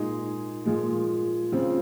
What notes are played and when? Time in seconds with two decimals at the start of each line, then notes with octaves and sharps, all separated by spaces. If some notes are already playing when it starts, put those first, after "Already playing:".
Already playing: A#2 G#3 D#4 G#4
0.66 A#2 F3 G#3
1.52 C#3 F3 C4